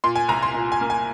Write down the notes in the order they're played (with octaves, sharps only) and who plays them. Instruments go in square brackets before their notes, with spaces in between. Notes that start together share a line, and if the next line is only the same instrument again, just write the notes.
[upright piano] A#2 C6
G#5
C2 A#5
C6
A#2
G#5
A#3
G#5